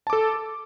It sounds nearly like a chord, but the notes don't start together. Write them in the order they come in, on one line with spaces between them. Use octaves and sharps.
A5 D6 A4